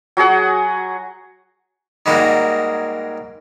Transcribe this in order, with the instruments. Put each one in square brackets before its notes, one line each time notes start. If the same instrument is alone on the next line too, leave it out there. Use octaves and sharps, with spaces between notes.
[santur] F#3 F#4 G#4 F#5
[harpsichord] G#2 G3 G#3 A#3 F#4